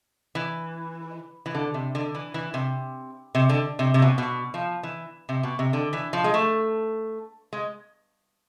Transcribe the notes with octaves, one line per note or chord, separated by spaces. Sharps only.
E3
E3
D3
C3
D3
E3
E3
C3
C3
D3
C3
C3
B2
B2
F3
E3
C3
B2
C3
D3
E3
F3
G#3
A3
G#3